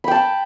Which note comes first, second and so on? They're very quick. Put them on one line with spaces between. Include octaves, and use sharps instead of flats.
B5 G5 A5